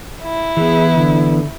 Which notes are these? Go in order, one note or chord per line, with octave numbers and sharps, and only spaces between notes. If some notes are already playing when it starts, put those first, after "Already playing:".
E4
E3 B3 G#4
D3